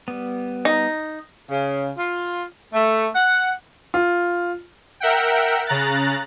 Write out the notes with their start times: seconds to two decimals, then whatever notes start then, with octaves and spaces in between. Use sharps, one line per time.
0.08 G3 B3
0.65 D#4
1.50 C#3
1.97 F4
2.74 A3
3.15 F#5
3.94 F4
5.00 A#4 E5 F#5 G5
5.67 C#3 A#5 F#6 A6